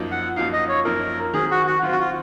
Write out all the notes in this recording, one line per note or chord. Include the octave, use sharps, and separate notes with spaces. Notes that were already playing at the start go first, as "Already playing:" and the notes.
Already playing: F#2 F3 A#3 D#4
F#5
F#2 F3 A#3 D#4 F5
D#5
C#5
F#2 F3 A#3 D#4 A#4
D#3 F#3 C4 G#4
F#4
F#4
D#3 F#3 C4 F4
F#4
F4